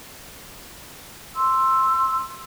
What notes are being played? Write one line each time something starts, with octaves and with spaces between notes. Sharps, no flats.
C6 E6